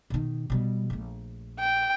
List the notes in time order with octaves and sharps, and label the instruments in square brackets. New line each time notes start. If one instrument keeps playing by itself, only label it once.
[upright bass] B2 D#3
B2 G3
A#1 A3
[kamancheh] G5